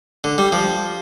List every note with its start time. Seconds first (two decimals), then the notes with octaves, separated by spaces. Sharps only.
0.24 D3
0.38 G3
0.52 F3